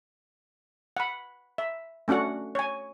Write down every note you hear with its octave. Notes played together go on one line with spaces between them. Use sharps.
F#5 B5
E5
A3 C#4 D4 F#4 F#5
C#5 G#5